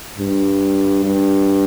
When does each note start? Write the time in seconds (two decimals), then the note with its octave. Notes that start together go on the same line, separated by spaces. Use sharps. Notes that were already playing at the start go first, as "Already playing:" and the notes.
0.19 G2
1.04 G2